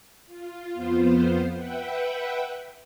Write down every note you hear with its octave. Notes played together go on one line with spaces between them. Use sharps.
F4
F2 B3 F4 C5
B4 E5 F#5 G5